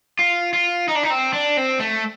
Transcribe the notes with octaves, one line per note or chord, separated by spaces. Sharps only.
F4
F4
D#4
D4
D#4
C4
D4
C4
A3